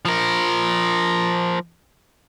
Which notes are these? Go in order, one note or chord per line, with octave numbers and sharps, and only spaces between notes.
F3 A#4